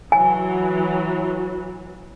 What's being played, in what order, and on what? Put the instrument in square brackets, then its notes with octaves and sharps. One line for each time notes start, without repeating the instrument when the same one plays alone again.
[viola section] E3 F#3 [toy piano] G#5